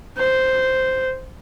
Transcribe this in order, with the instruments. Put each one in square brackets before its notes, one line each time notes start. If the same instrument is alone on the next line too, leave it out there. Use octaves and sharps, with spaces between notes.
[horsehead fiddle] C5